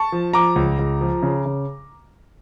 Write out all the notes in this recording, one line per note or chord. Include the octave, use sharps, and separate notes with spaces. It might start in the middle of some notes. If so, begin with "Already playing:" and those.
Already playing: A5 C#6
F3
F3 A#5 D6
C#2
C#2
F3
C#3
C#3